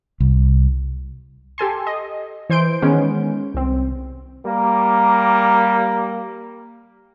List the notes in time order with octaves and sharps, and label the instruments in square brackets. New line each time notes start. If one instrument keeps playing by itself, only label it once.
[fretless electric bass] C2
[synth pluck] G4 A4 G#5 C6
D#5
E3 C5 C6 G6 D7
D#3 G#3 B3 C#4
C2 C4
[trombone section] G3 A#3